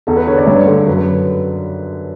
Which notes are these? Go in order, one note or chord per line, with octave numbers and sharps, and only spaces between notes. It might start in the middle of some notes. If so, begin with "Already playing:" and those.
E2 A4
B4
D3 C#5
D5
G2 C#5
D3
F#2 B4
B4